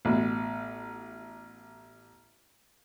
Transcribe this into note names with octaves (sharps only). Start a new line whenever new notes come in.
A1 B2